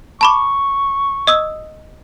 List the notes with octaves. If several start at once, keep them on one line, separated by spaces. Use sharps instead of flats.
A5 B5 C#6 D6
D#5 D#6 E6